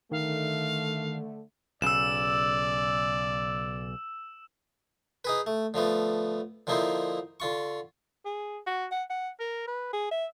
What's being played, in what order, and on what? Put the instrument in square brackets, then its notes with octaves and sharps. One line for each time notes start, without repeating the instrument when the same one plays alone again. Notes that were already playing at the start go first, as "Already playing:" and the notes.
[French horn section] D3 A3 [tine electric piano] D#3 [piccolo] F5
[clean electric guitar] B1 C#3 [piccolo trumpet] D5 [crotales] E6 E7
[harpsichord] D#4 G#4 B4
A3
D3 F3 A3 B3
D3 F3 A#3 D#4 E4 C5
D3 F4 C#6
[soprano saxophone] G#4
F#4
F#5
F#5
A#4
B4
G#4
E5